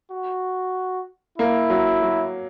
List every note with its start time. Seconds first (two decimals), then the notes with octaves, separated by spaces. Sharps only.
0.11 F#4
1.38 A#3 E4
1.70 F#3
2.02 F#3